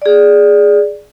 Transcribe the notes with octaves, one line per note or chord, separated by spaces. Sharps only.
G#4 D5